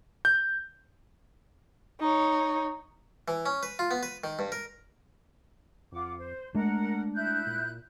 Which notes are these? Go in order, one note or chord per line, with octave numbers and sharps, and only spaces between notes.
G6
D#4 C#5
E3
C#4
B4
F4
B3
B4
D#3
G2
A#4
F2 F4 F#5 D6
C5
G#3 A3 D4 A#4 F#5
E4 F#6 G6
A#2